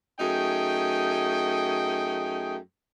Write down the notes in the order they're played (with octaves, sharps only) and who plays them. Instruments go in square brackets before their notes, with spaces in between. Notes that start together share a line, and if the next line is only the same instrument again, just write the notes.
[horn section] F#2 A3 D#4 G#4 G5